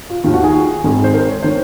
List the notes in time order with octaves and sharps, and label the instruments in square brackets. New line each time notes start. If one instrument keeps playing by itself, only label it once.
[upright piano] F4
D#2 D#3 F4
F#4
G#4
G#1 G#2 D#3
C5
A#4
C#5
D#3 C5